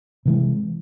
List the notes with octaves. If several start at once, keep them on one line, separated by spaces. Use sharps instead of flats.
C3 E3 G#3